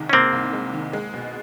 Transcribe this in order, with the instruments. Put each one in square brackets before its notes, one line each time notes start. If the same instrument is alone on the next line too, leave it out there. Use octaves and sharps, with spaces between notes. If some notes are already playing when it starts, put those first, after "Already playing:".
Already playing: [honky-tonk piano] C2 C3 D#3 G#3
[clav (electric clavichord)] C#4
[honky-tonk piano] C3 [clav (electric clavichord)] A#3 C4
[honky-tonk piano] C2
G#3
D#3
G#3
B2